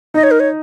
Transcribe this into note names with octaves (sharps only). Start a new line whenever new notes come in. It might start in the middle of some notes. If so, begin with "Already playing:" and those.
D#4 D#5
C#5
A#4
C#5